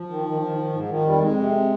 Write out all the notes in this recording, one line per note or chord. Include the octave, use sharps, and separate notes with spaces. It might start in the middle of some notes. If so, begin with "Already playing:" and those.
Already playing: F3
D#3
D#3
D#3
D#3
G#2
D#3 F3
F2 G3
F2 G#3
C3